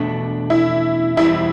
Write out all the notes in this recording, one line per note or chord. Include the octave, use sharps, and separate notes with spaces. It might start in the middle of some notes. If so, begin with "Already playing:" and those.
Already playing: E2 B2 A3 D4
E4
E2 B2 G3 C4 E4